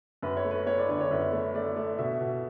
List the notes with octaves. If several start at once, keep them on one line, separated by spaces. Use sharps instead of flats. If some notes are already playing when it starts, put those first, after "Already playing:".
F#2 B4
C#5
A3
B4
A3 C#5
D5
D3 C#5
C#5
F#2 B4
A3
A3 D5
A3
B2 E5
B2